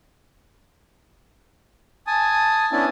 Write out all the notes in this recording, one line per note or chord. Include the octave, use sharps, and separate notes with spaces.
G#5 A5 D#6
B3 C#4 D4 E4 A5